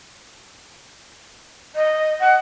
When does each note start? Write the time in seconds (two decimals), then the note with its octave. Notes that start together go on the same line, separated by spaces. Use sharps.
1.75 D#5
2.21 F#5